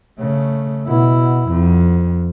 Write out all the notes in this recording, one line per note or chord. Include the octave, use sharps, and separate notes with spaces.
C#3 A3
B2 E4
F2